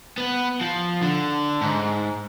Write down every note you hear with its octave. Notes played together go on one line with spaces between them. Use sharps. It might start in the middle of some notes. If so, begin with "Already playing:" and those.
B3
F3
D3
G#2